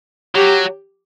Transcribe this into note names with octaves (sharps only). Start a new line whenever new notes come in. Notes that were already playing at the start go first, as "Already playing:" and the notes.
F#3 G4